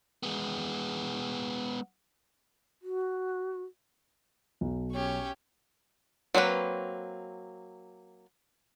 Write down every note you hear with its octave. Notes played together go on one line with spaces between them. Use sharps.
G#3 B3
F#4
B1
C#4 G4 C#5
F#3 A#3 C4 F4 B4